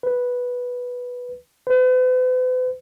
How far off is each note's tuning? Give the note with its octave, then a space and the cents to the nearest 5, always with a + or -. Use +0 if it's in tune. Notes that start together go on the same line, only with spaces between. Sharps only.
B4 -5
B4 +45